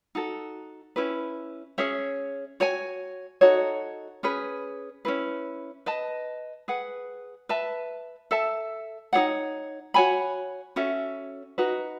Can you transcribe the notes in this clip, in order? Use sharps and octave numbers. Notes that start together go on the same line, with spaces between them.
D#4 F#4 A4
C#4 E4 B4
C#4 G#4 C#5 E5
F#4 C#5 G#5
D#4 F#4 A4 C#5
C#4 G#4 B4
C#4 E4 B4
B4 D#5 A5
G#4 B4 F#5
B4 E5 A5
A4 E5 A5
D#4 G#4 C#5 F#5
F#4 C#5 G#5 B5
C#4 F#4 A4 E5
D#4 F#4 B4